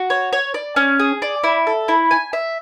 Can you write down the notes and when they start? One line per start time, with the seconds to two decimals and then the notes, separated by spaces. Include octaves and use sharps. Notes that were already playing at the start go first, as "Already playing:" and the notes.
Already playing: F#4
0.10 C#5
0.33 C#5
0.54 D5
0.76 C#4
0.99 G#4
1.22 D5
1.44 E4
1.67 A4
1.88 E4
2.11 G#5
2.33 E5